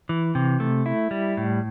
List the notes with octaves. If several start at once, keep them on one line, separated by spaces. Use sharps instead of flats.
E3
C3
A3
E4
G3
A2